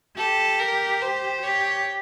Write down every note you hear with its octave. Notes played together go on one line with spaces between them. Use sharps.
G4 A4
A#4
C5
G4 C#5